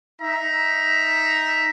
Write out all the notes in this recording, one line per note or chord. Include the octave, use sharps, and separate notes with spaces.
D#4 E5 A#5